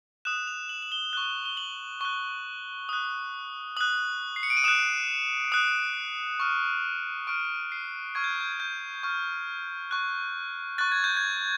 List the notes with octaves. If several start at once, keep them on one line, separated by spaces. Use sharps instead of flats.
D#6 F#6 E7
F7
F#7
F#7
G7
C#6 F#6 G7
G7
F#7
C#6 F#6 G7
D#6 F#6
D#6 F#6 F#7
C7
C#7
D7
D#7
D#6 F#6 E7
D#6 F#6
C#6 F6
C#6 F6 D7
C7
C#6 F6 G#6
G6
G6
G#6
G6
C#6 F6
C#6 F#6
C#6 F#6 A6
G#6
G6
G#6